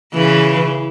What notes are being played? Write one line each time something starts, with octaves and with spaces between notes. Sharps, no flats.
C#3 E3